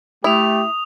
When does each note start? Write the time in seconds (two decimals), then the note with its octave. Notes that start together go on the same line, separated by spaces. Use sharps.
0.24 A3 E4 G4 D#6 F7